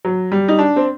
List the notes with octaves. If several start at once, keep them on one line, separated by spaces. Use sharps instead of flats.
F#3
G3
D#4
D4
C4